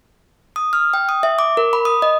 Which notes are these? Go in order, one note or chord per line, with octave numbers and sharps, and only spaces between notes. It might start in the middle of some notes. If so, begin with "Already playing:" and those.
D#6
F6
G5
D#6
E5
D6
A#4
B5
D#6
D#5